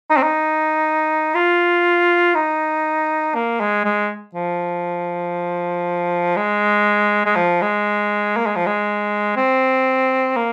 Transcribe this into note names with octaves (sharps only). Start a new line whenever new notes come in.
D#4
C4
D#4
F4
D#4
A#3
G#3
G#3
F3
G#3
G#3
F3
G#3
A#3
G#3
F3
G#3
C4
A#3